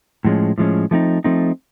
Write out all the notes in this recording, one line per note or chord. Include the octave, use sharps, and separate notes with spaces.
A2 F3 G#3 C#4
A2 F3 G#3 C#4
F3 A3 C4 D#4
F3 A3 C4 D#4